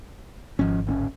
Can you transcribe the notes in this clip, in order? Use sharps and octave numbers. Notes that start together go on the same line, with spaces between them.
G#1 F3 C#4
D1 C4 C#4